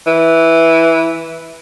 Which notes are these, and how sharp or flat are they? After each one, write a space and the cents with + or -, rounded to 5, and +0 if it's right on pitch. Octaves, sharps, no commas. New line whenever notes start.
E3 -5